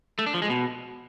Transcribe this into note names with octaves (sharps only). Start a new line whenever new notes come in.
A3
D4
F3
G#3
B2